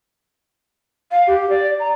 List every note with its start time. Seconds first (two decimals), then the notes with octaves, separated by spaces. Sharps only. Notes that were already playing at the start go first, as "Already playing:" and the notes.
1.11 F5
1.27 G4
1.50 D5
1.79 A#5